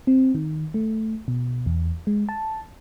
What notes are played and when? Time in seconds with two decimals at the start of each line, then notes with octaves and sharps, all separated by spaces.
0.07 C4
0.35 D#3
0.74 A3
1.28 B2
1.66 E2
2.07 G#3
2.29 A5